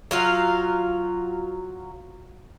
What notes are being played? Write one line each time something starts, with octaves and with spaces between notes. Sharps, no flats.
F#3 F4 F5